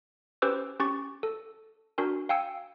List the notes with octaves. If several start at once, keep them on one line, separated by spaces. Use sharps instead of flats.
C#4 G4 B4 C5 D6 E6
C#4 G4 C#6 A6
A4
D4 F#4 A#4 G#5
F5 G5 G#5 E6 C#7